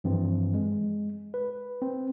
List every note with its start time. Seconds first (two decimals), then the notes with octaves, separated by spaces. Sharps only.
0.04 G2 E3 F3 C4
0.54 G#3
1.34 B4
1.82 C4